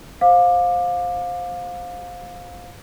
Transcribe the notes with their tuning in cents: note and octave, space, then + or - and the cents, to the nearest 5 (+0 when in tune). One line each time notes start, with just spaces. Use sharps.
C5 +0 F5 +25 D6 +15